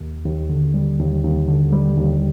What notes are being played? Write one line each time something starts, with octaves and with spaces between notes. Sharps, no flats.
D#2
D#2
D3
G3
D#2
D#2
D3
G3
D#2